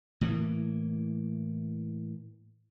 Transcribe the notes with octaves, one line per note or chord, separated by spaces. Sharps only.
A2 E3 A#3